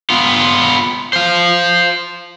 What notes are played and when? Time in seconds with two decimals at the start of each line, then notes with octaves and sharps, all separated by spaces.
0.10 B3 F4
1.13 C5 F5